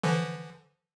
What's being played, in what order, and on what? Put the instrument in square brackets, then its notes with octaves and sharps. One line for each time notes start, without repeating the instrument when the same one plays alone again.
[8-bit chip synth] D3 E3 F3